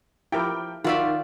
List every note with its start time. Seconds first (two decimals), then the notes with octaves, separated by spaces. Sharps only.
0.32 F3 E4 G4 A#4 G5
0.84 D#3 F4 F#4 D5 E5 F5